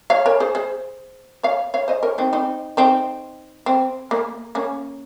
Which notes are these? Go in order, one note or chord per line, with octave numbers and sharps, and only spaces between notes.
C#5 F5
A#4 C#5
G#4 C5
G#4 C5
C#5 F5
C#5 F5
C5 D#5
A#4 C#5
C4 D#4
C4 D#4
C4 D#4
C4
A#3
A#3 C#4